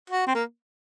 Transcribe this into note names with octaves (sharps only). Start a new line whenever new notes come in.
F#4
C4
A#3